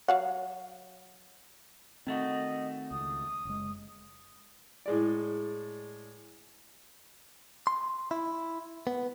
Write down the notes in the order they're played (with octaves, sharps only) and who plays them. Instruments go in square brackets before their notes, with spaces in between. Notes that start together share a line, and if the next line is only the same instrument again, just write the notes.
[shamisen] F#3 F5 F#5
[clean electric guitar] D#3 A3 F#4 [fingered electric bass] C4 [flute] D#5
[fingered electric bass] C#2 [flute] D#6
[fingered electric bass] F#1 G#3
[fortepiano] A2 G#3 D5
[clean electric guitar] C6
E4
B3